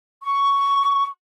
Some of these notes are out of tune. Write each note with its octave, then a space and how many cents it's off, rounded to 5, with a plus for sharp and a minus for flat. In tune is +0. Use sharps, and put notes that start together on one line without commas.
C#6 +10